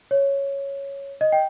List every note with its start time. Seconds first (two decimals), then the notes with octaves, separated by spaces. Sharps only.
0.11 C#5
1.21 D#5
1.32 G5